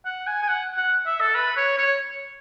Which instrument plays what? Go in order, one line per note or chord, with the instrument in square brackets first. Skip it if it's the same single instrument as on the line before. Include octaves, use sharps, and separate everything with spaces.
[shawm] F#5
G#5
G#5
F#5
F#5
E5
A4
B4
C#5
C#5